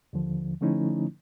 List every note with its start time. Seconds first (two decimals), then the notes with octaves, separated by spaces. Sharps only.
0.13 D#2 D3 F3
0.61 D3 F3 A3 C#4 D#4 E4